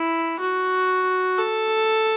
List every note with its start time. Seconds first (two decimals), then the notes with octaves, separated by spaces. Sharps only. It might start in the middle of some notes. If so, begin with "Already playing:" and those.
Already playing: E4
0.40 F#4
1.38 A4